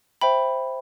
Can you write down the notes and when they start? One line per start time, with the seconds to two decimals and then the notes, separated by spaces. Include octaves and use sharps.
0.21 C5 E5 G5 B5